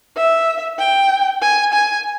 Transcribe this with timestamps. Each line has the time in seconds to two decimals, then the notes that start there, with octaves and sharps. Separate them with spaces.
0.17 E5
0.79 G5
1.42 G#5
1.73 G#5